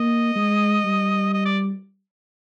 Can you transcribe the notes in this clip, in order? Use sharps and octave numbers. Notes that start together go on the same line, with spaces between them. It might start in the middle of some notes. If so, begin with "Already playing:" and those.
Already playing: A#3 D#5
G#3
G3
D#5
D5